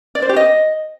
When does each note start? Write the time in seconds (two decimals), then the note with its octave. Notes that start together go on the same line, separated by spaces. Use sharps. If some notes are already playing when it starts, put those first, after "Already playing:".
0.15 D5
0.22 C5
0.29 G4
0.36 D#5